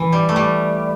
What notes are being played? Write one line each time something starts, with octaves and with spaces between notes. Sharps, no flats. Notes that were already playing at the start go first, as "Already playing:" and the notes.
Already playing: E3
G3
A3
G3